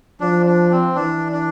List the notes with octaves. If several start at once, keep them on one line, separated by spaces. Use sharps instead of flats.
F3 D4
D4
C4
E3 D4
D4